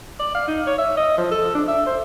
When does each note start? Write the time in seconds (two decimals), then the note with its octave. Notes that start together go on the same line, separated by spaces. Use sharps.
0.19 D5
0.35 F5
0.48 D#4
0.67 C#5
0.78 E5
0.97 D#5
1.18 F3
1.31 A4
1.55 D4
1.68 E5
1.86 C5